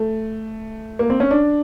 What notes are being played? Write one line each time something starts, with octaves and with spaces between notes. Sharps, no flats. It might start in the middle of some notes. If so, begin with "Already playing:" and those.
Already playing: A3
A#3
C4
C#4
D4